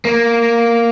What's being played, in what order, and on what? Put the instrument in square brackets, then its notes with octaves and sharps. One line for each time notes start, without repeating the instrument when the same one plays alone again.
[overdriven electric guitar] A#3